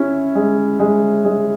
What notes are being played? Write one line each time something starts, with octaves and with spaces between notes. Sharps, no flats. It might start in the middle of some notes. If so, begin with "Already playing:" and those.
Already playing: C#4 E4
G#3
G#3
G#3